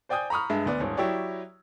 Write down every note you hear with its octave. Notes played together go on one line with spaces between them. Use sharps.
C5 D5 G5 G#5 D#6 G6
A#5 B5 C#6 D#6 F6
G2 G#3 E5
D2 B3 D5
D#1 G#2 C#5
F#3 E4 G4 C#5 D5